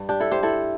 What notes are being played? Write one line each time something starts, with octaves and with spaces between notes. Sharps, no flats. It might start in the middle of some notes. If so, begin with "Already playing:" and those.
Already playing: G2 G3
D4 G4
E4 A4
G4 C5
E4 A4